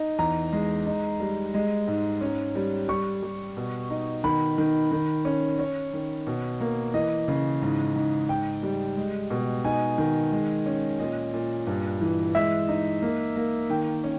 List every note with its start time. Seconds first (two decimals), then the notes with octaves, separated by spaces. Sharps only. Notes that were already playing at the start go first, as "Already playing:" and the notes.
Already playing: D#4
0.19 E2 A#5
0.53 G#3
0.86 D#4
1.20 G3
1.54 G#3
1.87 G#2
2.21 C#4
2.55 G3
2.89 G3 C#6
3.23 G3
3.57 B2
3.90 D#4
4.24 D#3 B5
4.58 D#3
4.91 D#3
5.25 C#4
5.59 C#4 C#5
5.93 D#3
6.27 B2
6.61 A#3
6.94 E3 D#5
7.28 C#3
7.62 G#2
7.95 G#2
8.29 G#2 G5
8.63 G3
8.97 G#3
9.30 B2
9.64 D#4 G#5
9.98 D#3
10.32 G#3
10.66 C#4
11.00 A#2 D#5
11.33 A#2
11.67 G2
12.01 E3
12.35 G#3 E5
12.69 D#4
13.02 A#3
13.36 A#3
13.70 D#3 G5
14.04 C#4